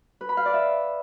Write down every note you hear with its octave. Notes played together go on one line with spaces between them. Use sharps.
B4
B5
F5
D5
E5